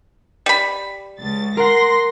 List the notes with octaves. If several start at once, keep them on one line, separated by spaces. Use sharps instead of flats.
G3 B5
C#2 A6
A#4 F#5 C6 A#6